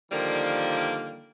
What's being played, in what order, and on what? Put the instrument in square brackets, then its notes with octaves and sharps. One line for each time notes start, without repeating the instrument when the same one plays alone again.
[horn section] D3 D#3 F3 G3 A#3